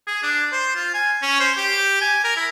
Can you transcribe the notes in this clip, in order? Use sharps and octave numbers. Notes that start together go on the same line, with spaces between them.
G#4
D4
C5
F4
G#5
C#4
C5
G4
G#5
A#4
E4